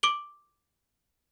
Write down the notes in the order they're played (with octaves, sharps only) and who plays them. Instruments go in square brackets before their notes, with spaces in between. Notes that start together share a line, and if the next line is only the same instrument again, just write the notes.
[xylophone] D6 D7 F#7 G7